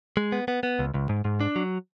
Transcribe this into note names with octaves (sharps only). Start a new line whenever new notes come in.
G#3
B3
B3
B3
C#2
C#2
G#2
G#2
D4
F#3